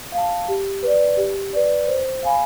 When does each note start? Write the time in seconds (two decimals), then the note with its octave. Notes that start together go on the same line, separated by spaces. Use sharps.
0.12 F5
0.18 A5
0.48 G4
0.83 B4 D5
1.17 G4
1.53 B4 D5
1.87 C5
2.23 F5 G#5 B5